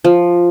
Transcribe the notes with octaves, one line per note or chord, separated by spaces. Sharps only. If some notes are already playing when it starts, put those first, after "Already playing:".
F3